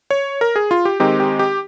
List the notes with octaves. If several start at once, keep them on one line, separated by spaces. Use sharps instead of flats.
C#5
A#4
G#4
F4
G4
D#3 G#3 C4 D#4 G4
G4
G4